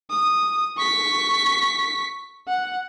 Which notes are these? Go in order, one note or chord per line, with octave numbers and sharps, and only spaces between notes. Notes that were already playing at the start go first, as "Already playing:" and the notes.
D#6
C#6 B6
F#5